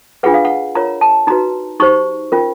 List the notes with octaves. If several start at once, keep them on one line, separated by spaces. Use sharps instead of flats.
D4 F4 G#4 B4 F#5
F5
F#5
F4 A#4 C#5 A#5
A5
D#4 F#4 B4 A#5
D#4 G4 C5 C#6
C#4 F4 A#4